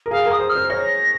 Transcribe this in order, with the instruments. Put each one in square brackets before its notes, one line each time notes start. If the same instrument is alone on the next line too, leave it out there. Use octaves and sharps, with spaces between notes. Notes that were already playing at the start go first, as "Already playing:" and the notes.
[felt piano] A#4
[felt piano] G#4 [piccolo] F5
[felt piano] A#4
[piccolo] D#6
[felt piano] C5
[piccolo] F6
[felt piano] C5
[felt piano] C#5 [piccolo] A#6